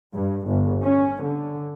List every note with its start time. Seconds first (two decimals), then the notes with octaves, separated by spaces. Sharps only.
0.13 G2
0.48 G1
0.81 C#4
1.22 D3